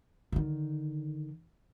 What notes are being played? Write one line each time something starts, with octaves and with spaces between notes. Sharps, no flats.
D3 D#3